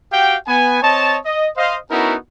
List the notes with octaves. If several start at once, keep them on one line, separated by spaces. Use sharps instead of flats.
F#4 G4 F5 G5
B3 G#5
C4 C#5 D#5 A5
D#5
C5 D#5 F5
B3 C#4 D#4 E4 F#4 A#4